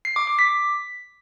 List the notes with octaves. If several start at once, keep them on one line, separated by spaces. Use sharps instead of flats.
C7
D6
D6
B6